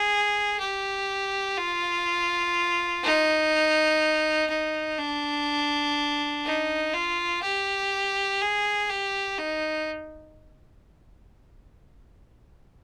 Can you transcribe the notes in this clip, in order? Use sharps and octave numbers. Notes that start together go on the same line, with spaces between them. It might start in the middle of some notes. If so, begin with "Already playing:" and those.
Already playing: G#4
G4
F4
D#4
D#4
D4
D#4
F4
G4
G#4
G4
D#4